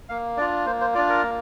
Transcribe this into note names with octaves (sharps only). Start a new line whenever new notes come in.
A#3 F5
D4 F4 D5
A#3 C5
C5
D4 F4 D5
A#4
A#3